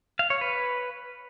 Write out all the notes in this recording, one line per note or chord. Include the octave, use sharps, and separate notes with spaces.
F5
C#5
B4